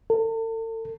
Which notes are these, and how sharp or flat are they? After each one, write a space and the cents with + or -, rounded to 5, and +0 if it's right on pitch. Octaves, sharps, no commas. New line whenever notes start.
A4 +40